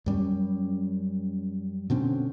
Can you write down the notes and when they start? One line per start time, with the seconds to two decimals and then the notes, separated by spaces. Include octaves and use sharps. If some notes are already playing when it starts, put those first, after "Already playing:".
0.06 F#2 G3 C#4
1.90 B2 D3 C4 C#4